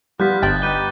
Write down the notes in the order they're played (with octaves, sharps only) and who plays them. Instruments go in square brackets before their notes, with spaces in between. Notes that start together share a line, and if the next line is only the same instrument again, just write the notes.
[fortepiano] G3 [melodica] B3 F4 [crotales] F#6 G6 B6
[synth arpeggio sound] G1 G5 F#6 [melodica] G#4 A5 [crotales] A6
[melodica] D#4 G4 B4 [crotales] G6 D#7 G7